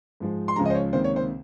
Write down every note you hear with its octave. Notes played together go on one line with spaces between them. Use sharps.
G#2 F3 G#3
C6
C#2 C#3 F3 G#3 A#5
D#5
C5
C#5
C#2 C3 D#3 A#3 C5
C#5
C5